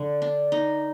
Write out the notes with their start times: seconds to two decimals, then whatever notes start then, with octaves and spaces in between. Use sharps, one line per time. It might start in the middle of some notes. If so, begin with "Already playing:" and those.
Already playing: D3
0.22 D4
0.52 D#4